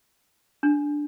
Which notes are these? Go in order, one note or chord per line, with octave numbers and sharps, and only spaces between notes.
D4